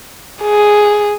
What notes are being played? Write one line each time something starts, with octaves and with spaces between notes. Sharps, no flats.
G#4